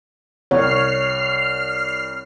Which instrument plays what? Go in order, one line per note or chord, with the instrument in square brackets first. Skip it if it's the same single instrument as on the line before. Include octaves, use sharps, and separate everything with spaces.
[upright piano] C2 [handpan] C#5 [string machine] F6 C7